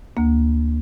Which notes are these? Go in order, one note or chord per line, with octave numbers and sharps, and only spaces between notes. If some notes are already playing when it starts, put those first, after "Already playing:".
D2 A#3